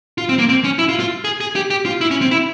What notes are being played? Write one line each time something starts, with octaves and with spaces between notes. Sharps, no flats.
F4
C4
A#3
C4
C#4
E4
F4
F4
G#4
G#4
G4
G4
F4
E4
C#4
C4
E4